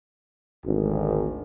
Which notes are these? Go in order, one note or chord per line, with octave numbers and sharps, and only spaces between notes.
G#1 D2